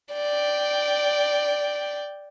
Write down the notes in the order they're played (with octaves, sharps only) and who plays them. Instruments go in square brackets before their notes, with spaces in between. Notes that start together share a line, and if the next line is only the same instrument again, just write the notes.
[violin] D5 G5